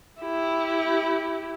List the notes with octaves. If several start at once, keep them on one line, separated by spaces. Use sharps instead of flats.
E4 G4